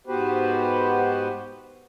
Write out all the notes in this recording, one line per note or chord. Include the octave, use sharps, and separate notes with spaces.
G#2 B3 F#4 G4 B4 C5